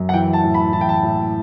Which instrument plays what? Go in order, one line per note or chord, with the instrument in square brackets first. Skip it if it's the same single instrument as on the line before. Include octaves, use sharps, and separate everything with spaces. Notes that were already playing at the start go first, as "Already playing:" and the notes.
Already playing: [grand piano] F#2
F#5
E3 G5
A5
A2
B5
E3 A5
G5
A5
A2